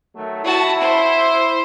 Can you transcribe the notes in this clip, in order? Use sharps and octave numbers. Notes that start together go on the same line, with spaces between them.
D#3 F#3 A3
E4 F#4 A5
C5